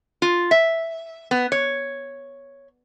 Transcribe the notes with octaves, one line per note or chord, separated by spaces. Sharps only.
F4
E5
B3
C#5